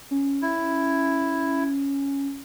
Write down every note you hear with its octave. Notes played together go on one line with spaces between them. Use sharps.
C#4
E4